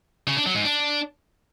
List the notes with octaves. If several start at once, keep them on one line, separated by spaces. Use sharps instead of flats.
C#3
D4
F#3
G#2
D4